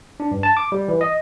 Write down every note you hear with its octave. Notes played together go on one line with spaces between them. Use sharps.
D4
G2
A5
D6
G3
E3
D#5